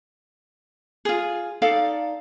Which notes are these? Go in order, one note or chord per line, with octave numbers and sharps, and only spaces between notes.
F4 G#4
D#4 A4 D5 F5